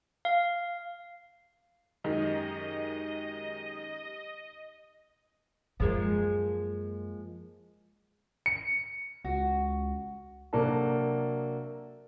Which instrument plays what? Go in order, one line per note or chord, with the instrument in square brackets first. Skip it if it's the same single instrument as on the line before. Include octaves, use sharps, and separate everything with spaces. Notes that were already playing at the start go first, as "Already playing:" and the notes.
[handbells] F5
[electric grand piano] F#2 D#3 G#3 [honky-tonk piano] D#4 [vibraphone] G4 [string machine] D#5
[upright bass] F#2 [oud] F3 G#3 A#3
[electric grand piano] C#7
[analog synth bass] C#2 [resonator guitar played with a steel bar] F#4
[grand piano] C3 F#3 A#3 D4 F#4 A4